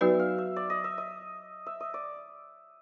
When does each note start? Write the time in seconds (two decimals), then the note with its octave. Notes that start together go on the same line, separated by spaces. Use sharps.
0.01 F#3 B3 D#4 F#4 B4 E5
0.19 F5
0.38 E5
0.56 D5
0.70 D#5
0.84 E5
0.98 D#5
1.66 E5
1.80 D#5
1.94 D5